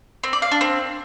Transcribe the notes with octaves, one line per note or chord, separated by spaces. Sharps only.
C4
D5
F5
D4
C4